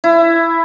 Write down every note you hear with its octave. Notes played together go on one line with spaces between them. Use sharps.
E4